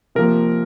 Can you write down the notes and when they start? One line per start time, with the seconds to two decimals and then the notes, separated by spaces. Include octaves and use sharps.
0.15 C3 F3 A#3 A#4